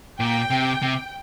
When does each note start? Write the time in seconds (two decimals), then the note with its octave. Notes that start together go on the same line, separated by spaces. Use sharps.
0.20 A#2 G5
0.50 C3
0.82 C3